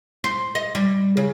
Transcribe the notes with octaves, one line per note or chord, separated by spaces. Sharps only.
C5
D#5
G3
C#3